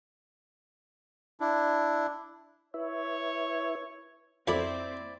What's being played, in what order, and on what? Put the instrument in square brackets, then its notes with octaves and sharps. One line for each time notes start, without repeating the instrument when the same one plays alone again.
[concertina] D4 E4
[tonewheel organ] E4 B4 E5 [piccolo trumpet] C#5
[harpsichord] F2 [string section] C4 [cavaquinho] E4 D5 B5